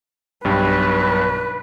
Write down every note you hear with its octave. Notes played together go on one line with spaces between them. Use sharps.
B1 G2 B4 G5